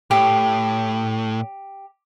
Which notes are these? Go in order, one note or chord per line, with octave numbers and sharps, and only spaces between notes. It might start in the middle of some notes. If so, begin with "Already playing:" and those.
A2 G4